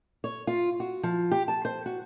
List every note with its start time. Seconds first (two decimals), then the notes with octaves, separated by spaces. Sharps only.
0.24 C#5
0.47 F4
0.80 F#4
1.03 F3
1.32 G4
1.48 A5
1.65 C5
1.86 F#4